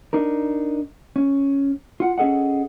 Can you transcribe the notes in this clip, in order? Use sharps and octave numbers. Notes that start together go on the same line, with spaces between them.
D4 D#4 A#4
C#4
F4 F#5
C#4 G#4 A4 D#5 F#5